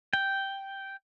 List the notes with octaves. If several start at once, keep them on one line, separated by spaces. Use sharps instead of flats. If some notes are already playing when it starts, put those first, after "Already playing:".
G5